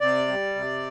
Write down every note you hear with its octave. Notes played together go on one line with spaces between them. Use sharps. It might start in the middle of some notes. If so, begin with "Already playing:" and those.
C3 D5
G3
C3